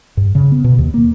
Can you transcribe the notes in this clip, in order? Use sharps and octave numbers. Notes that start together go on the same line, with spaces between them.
G2
C#3
B3
B2
D#2
A#3